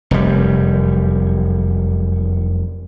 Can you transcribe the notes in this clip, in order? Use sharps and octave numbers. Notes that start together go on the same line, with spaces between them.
F1 F#2 G3